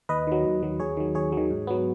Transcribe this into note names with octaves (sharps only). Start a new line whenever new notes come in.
D#2 B4 D#5
D#3 F#3
D#2
D#3 F#3
D#2 G#4 C#5
D#3 F#3
D#2 G#4 C#5
D#3 F#3
G#2
F#3 B3